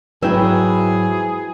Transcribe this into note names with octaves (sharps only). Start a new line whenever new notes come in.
G#2 F#3 E4 G#4 B4 E5 G5